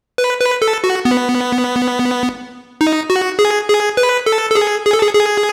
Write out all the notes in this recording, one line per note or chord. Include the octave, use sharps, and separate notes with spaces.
B4
B4
A4
F#4
B3
D#4
F#4
G#4
G#4
B4
A4
A4
G#4
G#4
A4
G#4
G#4